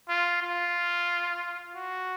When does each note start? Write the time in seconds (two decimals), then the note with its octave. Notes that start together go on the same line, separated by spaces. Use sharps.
0.09 F4
0.42 F4
1.75 F#4